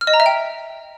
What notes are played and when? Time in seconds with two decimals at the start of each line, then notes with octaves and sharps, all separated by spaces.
0.01 F6
0.07 D#5
0.14 A#5
0.20 E5
0.26 G5